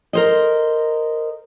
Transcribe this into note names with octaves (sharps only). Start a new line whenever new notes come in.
A#4 C5 D#5